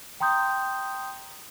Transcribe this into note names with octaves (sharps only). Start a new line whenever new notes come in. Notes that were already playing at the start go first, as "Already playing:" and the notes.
G5 A#5 C6 D#6 G6